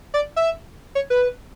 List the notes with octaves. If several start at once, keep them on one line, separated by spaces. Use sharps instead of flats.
D5
E5
C#5
B4